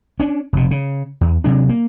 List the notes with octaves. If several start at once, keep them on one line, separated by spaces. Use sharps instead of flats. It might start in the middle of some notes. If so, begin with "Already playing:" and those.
C#4 D4
F1 B2
C#3
E2
C3 F#3 D4
A#3